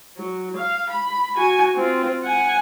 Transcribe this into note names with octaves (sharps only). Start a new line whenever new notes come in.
F#3
F5
B5
F#4 G#5
C4 F4
F#5 G#5